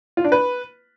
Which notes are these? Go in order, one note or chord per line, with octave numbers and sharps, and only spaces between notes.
F4
D4
B4